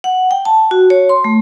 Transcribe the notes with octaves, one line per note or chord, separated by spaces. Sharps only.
F#5
G5
A5
F#4
C#5
C6
A3